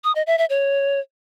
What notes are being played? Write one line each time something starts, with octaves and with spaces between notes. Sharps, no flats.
D#6
D#5
E5
E5
C#5